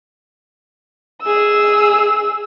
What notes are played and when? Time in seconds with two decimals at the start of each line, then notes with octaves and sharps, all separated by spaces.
1.22 G#4 E6